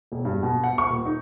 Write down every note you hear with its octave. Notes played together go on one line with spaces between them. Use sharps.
E1
G2
B2
F#5
C#6
D#1
D#4